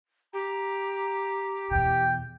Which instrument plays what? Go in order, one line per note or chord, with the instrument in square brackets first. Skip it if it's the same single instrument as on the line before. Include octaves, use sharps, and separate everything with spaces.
[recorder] G4 [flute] A#5
[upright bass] E2 B2 [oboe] G5